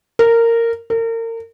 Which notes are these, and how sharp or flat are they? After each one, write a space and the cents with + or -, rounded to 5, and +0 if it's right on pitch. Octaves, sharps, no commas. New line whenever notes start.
A#4 -15
A#4 -35